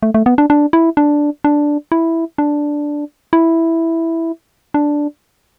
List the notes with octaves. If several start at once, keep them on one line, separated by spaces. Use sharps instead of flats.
A3
A3
B3
D4
D4
E4
D4
D4
E4
D4
E4
D4